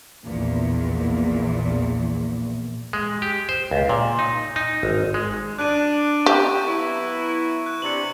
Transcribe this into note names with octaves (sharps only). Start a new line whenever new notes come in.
A#1 E2 A#2
G#3
G4
C5
C#2
A#2
D#4
D#4
G#1
G#3
D4 F#6 D#7
G4 C#6
F#3 B3 E4
F#6
C3 D4 C#7 F#7